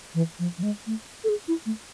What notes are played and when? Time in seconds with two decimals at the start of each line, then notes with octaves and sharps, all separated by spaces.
0.15 E3
0.39 F3
0.58 F3
0.63 G#3
0.87 A3
1.24 A4
1.29 G#4
1.48 E4
1.66 A3